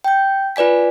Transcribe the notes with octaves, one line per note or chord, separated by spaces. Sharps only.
G5 G6
F4 B4 D5 G#5 B6